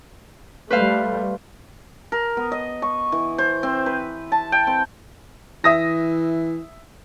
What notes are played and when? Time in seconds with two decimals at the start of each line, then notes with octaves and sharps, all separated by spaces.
0.70 G3 A3 B4 C5 F5
2.12 A#4
2.37 B3
2.52 D#5
2.82 C#6
3.12 E3
3.38 C5
3.63 C4
3.86 B4
4.32 A5
4.52 G5
4.67 C4
5.64 E3 E5 D#6 A#6